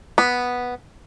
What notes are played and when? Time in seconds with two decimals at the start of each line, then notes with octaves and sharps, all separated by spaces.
0.18 B3